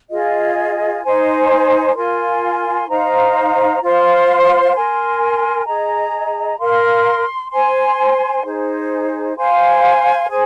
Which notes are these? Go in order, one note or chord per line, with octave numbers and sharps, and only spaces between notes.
F4 G#4 D#5
D#4 C5 G#5
F4 A#4 G#5 C6
D#4 C5 F5 A#5
F4 C5 F5 C6
A#4 G#5 C6
G#4 D#5 A#5
A#4 F5 C6
C5 G#5 C6
D#4 G#4 C5
C5 F5 G#5 C6
G#4 C5 G#5